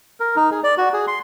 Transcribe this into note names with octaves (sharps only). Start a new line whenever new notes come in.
A#4
D#4
G#4
D5
F#4
G#4
C6